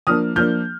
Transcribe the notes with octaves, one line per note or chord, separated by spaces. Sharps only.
F3 A#3 D4 D#6 F6
F3 A#3 D4 F6 G6